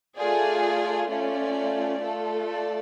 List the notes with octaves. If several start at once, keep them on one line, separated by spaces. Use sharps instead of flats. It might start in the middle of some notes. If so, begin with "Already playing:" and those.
A3 F4 G#4 D5
A3 C#4 F4 D5
A3 F4 A4
D5